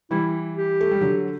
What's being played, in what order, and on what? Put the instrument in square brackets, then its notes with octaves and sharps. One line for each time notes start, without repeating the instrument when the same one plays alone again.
[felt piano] E3 G3 [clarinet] E4
[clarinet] G4
[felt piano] A3
G3
D3 F#3